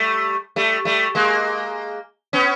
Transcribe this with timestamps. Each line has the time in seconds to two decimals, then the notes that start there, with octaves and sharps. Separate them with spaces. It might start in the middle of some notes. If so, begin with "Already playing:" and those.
Already playing: G3 A3
0.56 G3 A3
0.85 G3 A3
1.15 G#3 A#3
2.33 B3 C#4